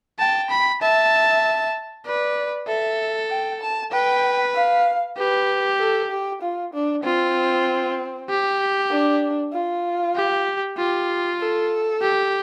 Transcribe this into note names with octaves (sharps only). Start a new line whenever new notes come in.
G5 A5
B5
E5 A5
B4 D5
A4 E5
G5
A5
B4 G5
F5
G4 B4
A4
G4
F4
D4
C4 F4
G4
D4
F4
G4
F4 G4
A4
G4